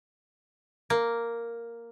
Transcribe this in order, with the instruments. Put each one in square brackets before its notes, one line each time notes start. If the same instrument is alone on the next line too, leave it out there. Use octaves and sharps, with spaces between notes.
[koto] A#3